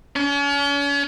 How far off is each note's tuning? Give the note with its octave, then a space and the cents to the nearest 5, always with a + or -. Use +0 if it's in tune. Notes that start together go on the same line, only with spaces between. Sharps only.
C#4 +40